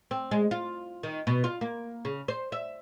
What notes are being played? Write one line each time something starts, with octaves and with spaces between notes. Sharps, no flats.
C4
G#3
F4
D#3
B2
F4
A#3
C#3
C5
E5